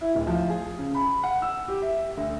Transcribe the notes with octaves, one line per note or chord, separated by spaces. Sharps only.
E4
D1
F3
G#4
C#3
B5
F#5
E6
G4
E5
D2